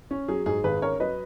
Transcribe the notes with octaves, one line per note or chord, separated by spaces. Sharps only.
C#4
F#3 G#4
G#2 G#4
G#1 G#4 B4
C#4 A#4 C#5
F#3 B4 D#5